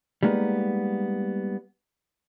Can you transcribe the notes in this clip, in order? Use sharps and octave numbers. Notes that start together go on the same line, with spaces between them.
G3 G#3 A#3 B3 D#4